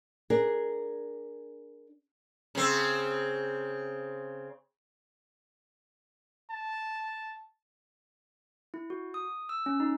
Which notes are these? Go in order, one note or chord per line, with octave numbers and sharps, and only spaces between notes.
D4 G#4 A#4
C#3 C4
A5
E4
F#4
D#6
E6
C#4
D#4